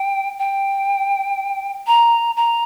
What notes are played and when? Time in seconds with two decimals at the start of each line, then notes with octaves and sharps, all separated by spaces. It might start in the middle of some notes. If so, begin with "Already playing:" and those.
Already playing: G5
0.39 G5
1.87 A#5
2.37 A#5